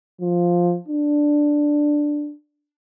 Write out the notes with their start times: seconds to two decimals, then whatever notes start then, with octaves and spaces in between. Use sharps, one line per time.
0.21 F3
0.88 D4